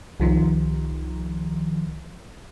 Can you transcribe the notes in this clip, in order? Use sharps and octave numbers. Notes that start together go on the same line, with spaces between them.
C2 D#3 F3